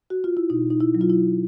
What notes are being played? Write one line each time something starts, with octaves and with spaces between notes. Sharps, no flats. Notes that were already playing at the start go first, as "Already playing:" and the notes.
F#4
F4
E4
B2 D#4
D#4
E4
F#3
F4
E4